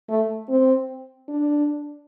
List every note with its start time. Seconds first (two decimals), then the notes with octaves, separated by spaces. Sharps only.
0.09 A3
0.49 C4
1.29 D4